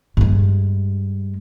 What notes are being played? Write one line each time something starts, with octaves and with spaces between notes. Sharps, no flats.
G2 G#3